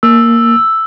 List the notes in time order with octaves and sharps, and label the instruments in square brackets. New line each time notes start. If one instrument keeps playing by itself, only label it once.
[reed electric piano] A#3 [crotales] E6